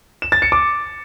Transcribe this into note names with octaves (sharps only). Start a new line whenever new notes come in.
E7
A6
C#7
D6